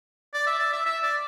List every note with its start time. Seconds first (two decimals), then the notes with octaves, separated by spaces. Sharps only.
0.34 D5
0.47 E5
0.59 D5
0.73 E5
0.86 E5
1.03 D5